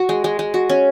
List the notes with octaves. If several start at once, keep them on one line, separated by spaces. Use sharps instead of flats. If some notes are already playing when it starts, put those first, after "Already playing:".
Already playing: F#4
G#3
G#3
G#3
F#4
C#4